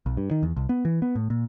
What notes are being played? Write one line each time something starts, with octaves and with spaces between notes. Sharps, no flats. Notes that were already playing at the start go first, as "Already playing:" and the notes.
B1
G2
D#3
E2
C2
B3
E3
B3
A2
A#2